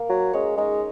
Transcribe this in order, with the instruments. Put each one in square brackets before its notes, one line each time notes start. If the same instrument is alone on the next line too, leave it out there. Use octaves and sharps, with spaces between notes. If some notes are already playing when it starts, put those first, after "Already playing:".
Already playing: [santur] A#3 A#4
[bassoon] F#3
[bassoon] G#3 [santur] C#4 C#5
[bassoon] G#3 [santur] D#4 D#5